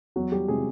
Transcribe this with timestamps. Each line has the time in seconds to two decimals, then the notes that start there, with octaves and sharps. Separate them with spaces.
0.16 E2 F#3 F#4
0.32 G3 G4
0.48 C3 G#3 G#4